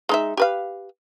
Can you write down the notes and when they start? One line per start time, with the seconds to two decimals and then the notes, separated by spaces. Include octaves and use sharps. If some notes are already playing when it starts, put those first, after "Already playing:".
0.09 G#3 D#4 E5
0.37 G4 B4 F5